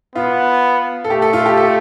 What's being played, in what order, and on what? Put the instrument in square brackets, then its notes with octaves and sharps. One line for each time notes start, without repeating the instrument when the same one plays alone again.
[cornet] B3 [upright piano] F4
[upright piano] A4
[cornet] A3 [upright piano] G4
[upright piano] A4
F4
A4
G4
A4